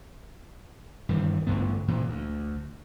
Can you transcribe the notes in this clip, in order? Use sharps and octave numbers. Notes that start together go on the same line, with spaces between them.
G2 D#3 E3
A1 G2 D3 B3
A#2 E3
D2